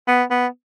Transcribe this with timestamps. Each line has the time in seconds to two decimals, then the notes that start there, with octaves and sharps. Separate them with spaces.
0.07 B3
0.31 B3